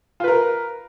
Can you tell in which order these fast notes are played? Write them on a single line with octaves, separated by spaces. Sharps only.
F4 B4 A#4